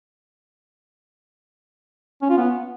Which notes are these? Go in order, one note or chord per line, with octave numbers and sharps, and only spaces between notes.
C#4
F4
B3